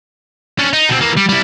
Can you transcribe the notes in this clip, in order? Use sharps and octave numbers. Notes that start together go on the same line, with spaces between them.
C#4 D4
D#4
B2 C4
E3 A#3
G3
G3 E4